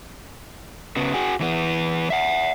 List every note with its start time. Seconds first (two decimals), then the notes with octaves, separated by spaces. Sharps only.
0.96 C#3 B3
1.14 F#4 G#4
1.40 E3 B3
2.10 E5 F#5